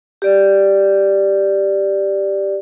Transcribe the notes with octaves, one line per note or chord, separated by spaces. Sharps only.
G4 D5